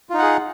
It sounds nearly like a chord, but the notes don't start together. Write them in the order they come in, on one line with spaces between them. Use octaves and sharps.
F4 D#4 F#5 G#4